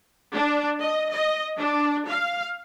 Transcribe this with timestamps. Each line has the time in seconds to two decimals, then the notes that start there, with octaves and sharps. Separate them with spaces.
0.32 D4
0.80 D#5
1.11 D#5
1.56 D4
2.07 F5